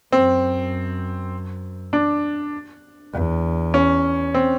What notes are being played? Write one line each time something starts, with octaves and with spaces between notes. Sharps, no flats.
F#2 C4
D4
E2
C#4
C4